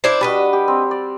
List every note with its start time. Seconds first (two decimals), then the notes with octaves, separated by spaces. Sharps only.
0.04 D4 E4 C5
0.21 G3 D4 F#4 B4 D#5
0.53 G4
0.68 C4
0.91 D5